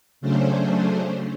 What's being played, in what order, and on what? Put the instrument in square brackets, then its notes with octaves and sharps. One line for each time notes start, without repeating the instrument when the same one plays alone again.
[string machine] C#3 F#3 A3 C#4 D4 C5